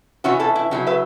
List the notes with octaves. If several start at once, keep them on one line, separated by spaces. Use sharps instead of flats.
E3 C#4 E4 F#4
E4 A4
E4
C#3 F#3 E4
B4 E5